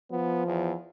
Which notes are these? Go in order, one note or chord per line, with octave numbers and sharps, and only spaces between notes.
F3 B3
E2